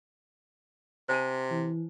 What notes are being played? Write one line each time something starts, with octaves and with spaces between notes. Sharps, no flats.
C3 C5 G#5 A5
E3